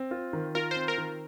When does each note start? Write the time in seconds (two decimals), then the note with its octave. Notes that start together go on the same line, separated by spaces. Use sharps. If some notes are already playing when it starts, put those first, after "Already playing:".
Already playing: C4
0.11 F4
0.33 D#3
0.55 F4 A#4
0.71 C5
0.76 C4
0.88 A#4
0.98 D#3